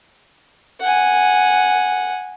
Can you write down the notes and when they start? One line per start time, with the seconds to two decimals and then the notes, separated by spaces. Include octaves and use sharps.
0.81 F#5 G#5